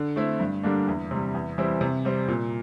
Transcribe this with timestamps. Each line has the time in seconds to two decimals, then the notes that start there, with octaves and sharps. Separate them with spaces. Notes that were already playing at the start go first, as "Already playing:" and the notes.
Already playing: D3
0.16 A3 C4 E4
0.40 G2
0.64 D3 G3 A#3 D4
0.88 E2
1.11 C3 G3
1.34 E2
1.58 E3 G3 C4 E4
1.81 C3
2.05 G3 C4
2.28 A#2